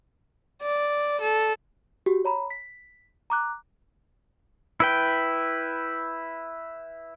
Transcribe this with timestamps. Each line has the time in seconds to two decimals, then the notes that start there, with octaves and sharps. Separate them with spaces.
0.62 D5
1.21 A4
2.06 F#4 G4
2.25 C#5 A#5 B5
2.50 B6
3.30 A#5 D6 F#6
4.80 E4 B4 G5